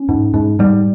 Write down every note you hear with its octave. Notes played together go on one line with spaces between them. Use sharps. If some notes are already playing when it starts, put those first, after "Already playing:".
Already playing: C#4
G#2
G#2
G#2 G3